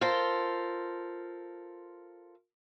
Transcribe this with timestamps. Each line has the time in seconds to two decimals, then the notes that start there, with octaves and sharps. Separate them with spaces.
0.01 F4 A4 A#4 C5